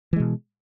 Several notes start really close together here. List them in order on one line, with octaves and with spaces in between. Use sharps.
E3 G#3 B2